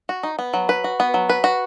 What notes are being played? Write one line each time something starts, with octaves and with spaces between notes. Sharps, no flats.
F#4
D#4
B3
F#3
B4
F#4
B3
F#3
B4
F#4